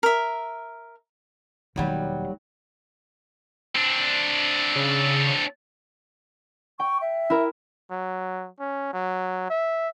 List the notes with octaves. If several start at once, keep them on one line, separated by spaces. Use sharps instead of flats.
A#4 E5
E1 D#2 D#3 F#3 G3
C4 D4
C#3
G5 C#6
E5
E4 A#4
F#3
C#4
F#3
E5